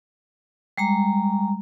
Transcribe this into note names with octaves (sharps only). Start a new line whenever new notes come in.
G3 G#3 A#5